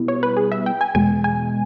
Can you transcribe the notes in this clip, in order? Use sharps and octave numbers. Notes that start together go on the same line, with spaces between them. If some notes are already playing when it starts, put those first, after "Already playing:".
Already playing: B2 G3 B3 E4
C#5
B4
G#4
E5
G5
G#5
E2 B2 G#3 G#5
G#5